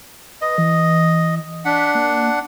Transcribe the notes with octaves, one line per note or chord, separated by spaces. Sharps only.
B4 D#5
E3
D4 F#5 B6
A#3